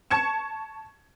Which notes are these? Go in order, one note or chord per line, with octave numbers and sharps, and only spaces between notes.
A5 C#6 G#6 C#7 E7